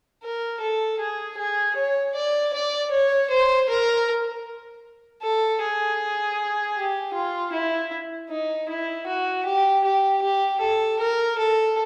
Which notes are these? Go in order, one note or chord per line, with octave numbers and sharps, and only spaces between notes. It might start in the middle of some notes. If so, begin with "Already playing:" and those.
A#4
A4
G#4
G#4
C#5
D5
D5
C#5
C5
A#4
A4
G#4
G4
F4
E4
D#4
E4
F#4
G4
G4
G4
A4
A#4
A4